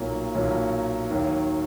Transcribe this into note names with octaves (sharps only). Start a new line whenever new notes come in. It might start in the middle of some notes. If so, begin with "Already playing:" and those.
Already playing: B1 A#2 F#3 A#3
B1 A#2 F#3 A#3
D#2 D#3 F#3